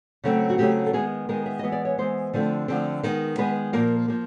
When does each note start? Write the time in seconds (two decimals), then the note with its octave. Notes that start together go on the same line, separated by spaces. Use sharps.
0.24 C#3 F#3 A3 C4
0.50 F#4
0.58 C#3 F#3 A3 C4 G4
0.86 A4
0.93 D#3 G#3 B3 G#4
1.29 D#3 G#3 B3 A#4
1.46 E5
1.59 E3 G#3 B3 D#5
1.72 D5
1.85 C#5
1.98 E3 G#3 B3 C5
2.34 D3 F3 A3 C4
2.68 D3 F3 A3 C4
3.03 D#3 G#3 B3
3.38 D#3 G#3 B3 B4
3.73 A#2 F3 A#3 A#4
4.08 F3 A#3